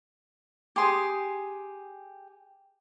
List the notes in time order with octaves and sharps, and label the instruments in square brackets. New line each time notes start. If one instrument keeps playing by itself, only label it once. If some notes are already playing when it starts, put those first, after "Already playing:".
[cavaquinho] G4 G#4 C6 D#6